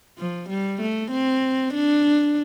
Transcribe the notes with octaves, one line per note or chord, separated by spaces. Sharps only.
F3
G3
A3
C4
D4